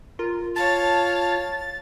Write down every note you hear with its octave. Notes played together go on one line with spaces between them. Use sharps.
F4 A#4
C#5 F5 A5 A6